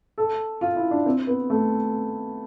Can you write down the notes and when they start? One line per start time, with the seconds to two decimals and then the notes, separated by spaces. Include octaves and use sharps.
0.18 A4
0.61 F4
0.76 E4
0.91 D4
1.06 C4
1.27 B3
1.50 A3